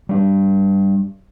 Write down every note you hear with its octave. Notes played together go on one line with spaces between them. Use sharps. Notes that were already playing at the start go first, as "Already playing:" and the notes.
G3 D4